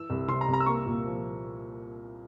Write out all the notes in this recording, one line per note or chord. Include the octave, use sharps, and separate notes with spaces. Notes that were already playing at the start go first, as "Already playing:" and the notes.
Already playing: E3 E6
C2
C3 C6
A#5
C2
A#5
E6
A#3 C#6
A#2
F3